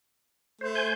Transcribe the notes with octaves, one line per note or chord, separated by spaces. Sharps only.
A3 C5
C5 G#5 G6